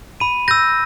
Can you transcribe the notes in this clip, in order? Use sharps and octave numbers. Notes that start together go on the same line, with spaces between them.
B5 D#7
E6 G6 A#6